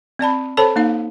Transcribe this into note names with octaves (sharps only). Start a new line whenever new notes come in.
C4 D5 A5 B5
A4 C5 C#5 A5 B5
A#3 D#4 F5